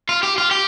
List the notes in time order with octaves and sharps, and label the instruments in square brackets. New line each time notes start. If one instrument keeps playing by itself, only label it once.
[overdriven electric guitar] F4
G4
F4
G4